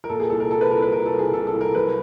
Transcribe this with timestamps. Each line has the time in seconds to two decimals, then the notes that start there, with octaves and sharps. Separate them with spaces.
0.04 A#4
0.09 A#2 A4
0.20 G#4
0.30 C2 A4
0.40 A#4
0.50 C2 A4
0.61 B4
0.71 C2 A#4
0.82 B4
0.92 C2 A#4
1.06 A4
1.13 C2
1.19 G#4
1.33 C2 A4
1.47 A4
1.54 C2
1.61 A#4
1.75 F#3 B4